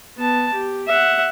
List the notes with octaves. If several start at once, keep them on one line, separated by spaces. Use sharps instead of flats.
B3 A5
G4
E5 F#5